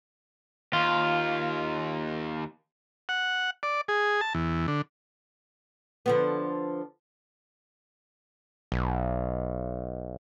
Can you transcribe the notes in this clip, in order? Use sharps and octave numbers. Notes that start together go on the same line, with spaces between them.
D#2 F4
F#5
D5
G#4
A5
E2
D3
D3 F3 B3
B1